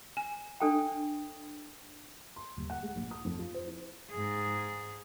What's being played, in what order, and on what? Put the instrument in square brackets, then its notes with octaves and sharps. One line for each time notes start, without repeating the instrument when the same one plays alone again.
[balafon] G#5
[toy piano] D4 A4 G5
[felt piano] C6
D#1
F#5
G#3
A#1
D#6
F2
F4
C5
E4
[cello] G#2 G#4